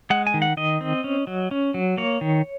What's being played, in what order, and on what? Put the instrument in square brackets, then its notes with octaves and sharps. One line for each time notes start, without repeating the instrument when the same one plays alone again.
[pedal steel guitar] G#3 F#5
G#5
D#3
F#5
D#3 D#5
C4
C#4
F#3
C#4
F#3
A#3 C#5
D#3